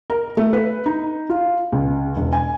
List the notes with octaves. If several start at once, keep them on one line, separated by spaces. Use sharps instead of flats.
A#4
A3
B4
D#4
F4
C#2
E1
G#5